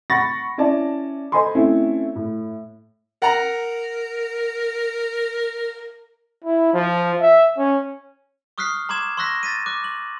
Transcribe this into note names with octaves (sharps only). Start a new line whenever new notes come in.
F#5 B5 C#6 A6 A#6
C#4 E4 D5 A5
A4 C5 D#5 G#5 B5 C6
A3 C4 C#4 E4
A2
A#4 F#5 A#5
E4
F3
E5
C#4
C#6 D#6 F6 F#6 B6 C7
A#5 C6 D6 G#6 E7
C6 C#6 E6 F#6 A#6 B6
A6 B6 D#7
D6 F#6
F#7